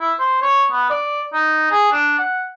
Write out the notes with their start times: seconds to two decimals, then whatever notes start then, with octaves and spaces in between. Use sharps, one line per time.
0.01 E4
0.19 C5
0.42 C#5
0.71 B3
0.90 D5
1.33 D#4
1.71 G#4
1.92 D4
2.19 F#5